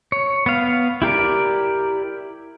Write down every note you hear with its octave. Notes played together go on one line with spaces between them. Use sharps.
C#5
B3 F5
E4 G4 A#4 D5